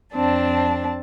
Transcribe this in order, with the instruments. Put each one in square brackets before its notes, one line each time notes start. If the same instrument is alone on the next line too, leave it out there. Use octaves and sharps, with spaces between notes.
[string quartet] F2 C4 D4 A5